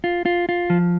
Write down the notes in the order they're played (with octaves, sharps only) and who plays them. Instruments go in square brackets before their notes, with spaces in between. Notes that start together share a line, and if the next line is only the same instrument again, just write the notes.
[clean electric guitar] F4
F4
F4
F3